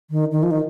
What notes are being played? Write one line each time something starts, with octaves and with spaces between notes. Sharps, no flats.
D#3
D#3
F3
D#3